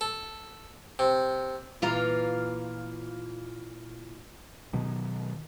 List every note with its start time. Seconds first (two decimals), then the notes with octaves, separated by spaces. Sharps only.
0.01 A4
0.99 C3
1.82 A#2 E3 F4 F5 A#5
4.73 B2 D#3 F#3